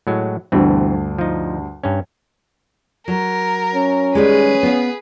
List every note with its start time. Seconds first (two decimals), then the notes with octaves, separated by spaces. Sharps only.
0.07 A2 F#3 G#3
0.52 D2 G2 B2 E3 C4
1.18 F3 D#4
1.84 G2 C#4
3.08 F#3 A#4
3.75 C#4
4.15 D#3 G3 G#3 G#4 B4
4.63 B3 F5